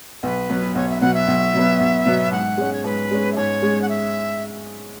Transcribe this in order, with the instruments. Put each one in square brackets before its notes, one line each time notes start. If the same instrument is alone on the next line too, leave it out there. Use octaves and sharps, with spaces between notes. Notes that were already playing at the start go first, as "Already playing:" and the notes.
[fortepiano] B1 [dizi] B4
[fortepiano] B2 F#3 B3
[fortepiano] B1 [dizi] C#5
[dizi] E5
[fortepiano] B2 F#3 B3 [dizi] F#5
[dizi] E5
[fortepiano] B1
B2 F#3 B3
B1
B2 F#3 B3
[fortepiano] G#2 [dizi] F#5
[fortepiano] G#3 C#4
[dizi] C#5
[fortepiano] G#2 [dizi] B4
[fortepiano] G#3 C#4
[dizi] E5
[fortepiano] G#2 [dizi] C#5
[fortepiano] G#3 C#4
[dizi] F#5
E5